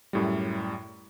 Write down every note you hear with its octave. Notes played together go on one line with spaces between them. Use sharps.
F#2 A2 G3